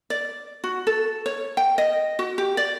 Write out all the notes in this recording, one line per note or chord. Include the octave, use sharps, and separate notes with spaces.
D5
F#4
A4
C#5
G5
D#5
F#4
G4
D5